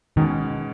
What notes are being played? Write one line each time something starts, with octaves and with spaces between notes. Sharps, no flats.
B2 D#3 G#3 C#4